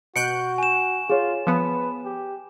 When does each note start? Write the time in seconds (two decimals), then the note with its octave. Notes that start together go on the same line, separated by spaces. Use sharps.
0.16 B2 F#4 F#6 G6 C#7 D7
0.58 G#5 E7
1.09 F4 G#4 C#5
1.47 F3 B3 B4
2.05 G4